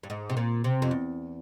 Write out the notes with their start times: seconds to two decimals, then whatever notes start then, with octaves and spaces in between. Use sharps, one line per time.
0.03 G2
0.10 G#2
0.30 C3
0.37 A#2
0.64 C3
0.82 F2
0.91 E2